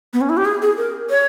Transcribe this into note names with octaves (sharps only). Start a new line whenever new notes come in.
B3
C#4
E4
G4
G#4
G#4
A#4
C#5